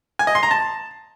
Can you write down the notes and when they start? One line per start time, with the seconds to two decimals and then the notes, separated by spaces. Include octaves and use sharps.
0.19 G#5
0.27 D#5
0.35 C6
0.43 A#5
0.51 A5